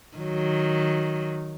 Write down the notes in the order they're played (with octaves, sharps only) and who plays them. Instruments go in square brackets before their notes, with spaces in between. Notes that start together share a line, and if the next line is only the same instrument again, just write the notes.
[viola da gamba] D#3 F#3